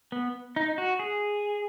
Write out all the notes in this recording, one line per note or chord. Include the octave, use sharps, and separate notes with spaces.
B3
D#4
F#4
G#4